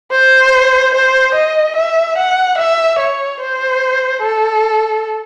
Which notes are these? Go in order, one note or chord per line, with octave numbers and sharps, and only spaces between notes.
C5
C5
D#5
E5
F#5
E5
C#5
C5
A4